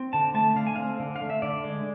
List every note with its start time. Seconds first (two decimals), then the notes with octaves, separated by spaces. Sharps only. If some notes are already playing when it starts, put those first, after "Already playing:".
Already playing: C4
0.13 D3 A5
0.34 A3 A5
0.56 D3 F5
0.67 G#5
0.76 C4 F5
1.00 D3
1.16 F5
1.21 A3
1.30 E5
1.42 D3 D5
1.64 G#3